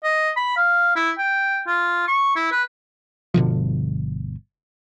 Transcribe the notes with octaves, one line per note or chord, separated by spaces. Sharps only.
D#5
B5
F5
E4
G5
F4
C#6
E4
B4
G1 B2 D3 F3